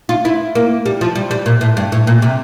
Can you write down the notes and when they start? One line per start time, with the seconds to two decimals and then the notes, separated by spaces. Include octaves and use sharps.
0.09 F4
0.25 E4
0.55 A#3
0.86 G3
1.01 F3
1.15 G3
1.31 G3
1.46 A#2
1.61 A2
1.77 G2
1.92 A2
2.07 A#2
2.22 C3